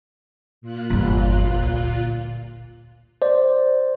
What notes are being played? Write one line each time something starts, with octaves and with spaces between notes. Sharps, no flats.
A#2 F4 F#6
G1 E2
D2
C5 D5